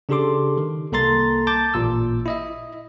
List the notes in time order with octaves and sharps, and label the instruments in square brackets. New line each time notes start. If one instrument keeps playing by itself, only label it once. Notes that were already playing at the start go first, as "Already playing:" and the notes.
[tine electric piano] C#3 D4 G4 A4 C6 D6
D#3
C2 A#3 A4 A#5 C6 A6
A5 D6 G6 A6
A1 A#2 E6
E4 D#5 E5